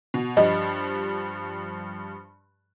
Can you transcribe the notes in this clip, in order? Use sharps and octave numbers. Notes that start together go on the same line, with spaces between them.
B2
G2 F3 G3 D#5